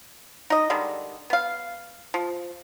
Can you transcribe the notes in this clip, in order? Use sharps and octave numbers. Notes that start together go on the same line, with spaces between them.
D#4 D#5
D3 D#3 G3 G#3
B3 F5
F3